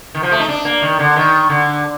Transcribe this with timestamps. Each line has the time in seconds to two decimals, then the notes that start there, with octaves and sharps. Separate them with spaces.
0.15 D#3
0.23 F3
0.32 A3
0.40 D#4
0.48 D4
0.65 A#3
0.82 D#3
0.99 D3
1.16 D#3
1.50 D3